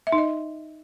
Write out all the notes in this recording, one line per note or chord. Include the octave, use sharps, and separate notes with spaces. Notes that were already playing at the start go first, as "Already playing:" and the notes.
E5
D#4
D#5